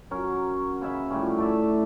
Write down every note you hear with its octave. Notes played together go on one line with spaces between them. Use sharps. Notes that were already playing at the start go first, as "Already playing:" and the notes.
F#3 C#4 A#4
C#3 C#4 E5 B5
A2 F3 G3 C#4
A3 D5 E5